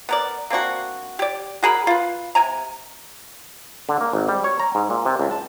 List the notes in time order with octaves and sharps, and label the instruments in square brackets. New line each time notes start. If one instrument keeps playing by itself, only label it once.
[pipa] B3 A#4 D5
A#3 C4 D4 F#4
G4 D5
F#4 G#4 A#4 B5
F4 B4
C3 G#5 A#5
[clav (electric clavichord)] D3
A#3
G#1
G3
C#5
A#5
G#2
A#2
C3
C#2
A5